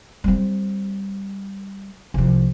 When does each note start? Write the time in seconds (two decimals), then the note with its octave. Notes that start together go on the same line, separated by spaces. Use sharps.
0.24 G3 C4
2.14 C2 F3